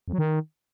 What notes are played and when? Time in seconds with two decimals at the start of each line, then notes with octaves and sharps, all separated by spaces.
0.08 F2
0.13 F#3
0.18 D#3